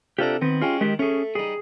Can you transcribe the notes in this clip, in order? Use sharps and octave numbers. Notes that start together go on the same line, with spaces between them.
C3 D4 F4 G4 A4 A#5
D#3 B3 C4
G#3 C#4 F4 G4
D#3 G#3 G4
A3 C#4 G#4
G3 D#4 G#4